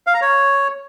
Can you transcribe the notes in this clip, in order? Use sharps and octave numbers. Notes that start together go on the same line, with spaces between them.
F5
A#5
C#5